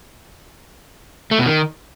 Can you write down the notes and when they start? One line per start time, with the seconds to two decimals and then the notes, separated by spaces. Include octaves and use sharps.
1.31 A3
1.39 B2
1.46 D#3